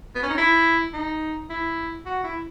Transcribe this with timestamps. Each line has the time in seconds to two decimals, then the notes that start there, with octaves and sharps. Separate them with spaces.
0.15 B3
0.23 C#4
0.29 D#4
0.38 E4
0.93 D#4
1.50 E4
2.06 F#4
2.24 E4